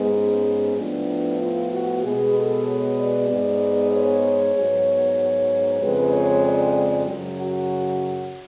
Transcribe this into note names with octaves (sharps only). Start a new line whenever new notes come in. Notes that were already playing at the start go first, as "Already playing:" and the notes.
Already playing: G#2 G#3 B3
C#4
A2 F3 B3 D4
F4
F#4
B2 G#3 B3 G#4
A4
C#5
D5
G#2 G#3 B3
C#5
G#2 F#3 B3
F2 C#3 G#3 B4
C#5
D5
F#2 C#3 F#3
F#4